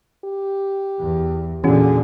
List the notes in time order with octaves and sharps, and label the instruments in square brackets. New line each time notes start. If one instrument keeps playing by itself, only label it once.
[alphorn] G4
[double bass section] E2
[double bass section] E2 A#2 D3 [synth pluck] E3 C#4 F#4 [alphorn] G#4